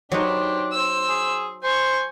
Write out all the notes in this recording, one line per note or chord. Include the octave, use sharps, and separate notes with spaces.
F#3 D4 D#4 G4 B4 C5
C5 E6
G#4
C5 G#5 C#6